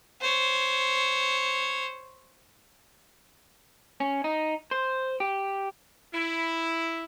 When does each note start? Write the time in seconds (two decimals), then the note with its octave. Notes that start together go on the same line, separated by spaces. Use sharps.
0.21 C5 C#5
4.00 C#4
4.24 D#4
4.71 C5
5.20 G4
6.13 E4